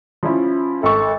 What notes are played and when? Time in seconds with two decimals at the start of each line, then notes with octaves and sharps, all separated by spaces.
0.23 F3 C#4 E4
0.83 G#1 A4 C#6